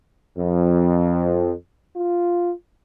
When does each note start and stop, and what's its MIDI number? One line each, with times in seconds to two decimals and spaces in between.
0.38 1.51 41
1.96 2.51 65